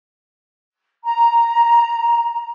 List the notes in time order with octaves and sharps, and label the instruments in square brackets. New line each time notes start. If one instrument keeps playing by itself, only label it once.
[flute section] A#5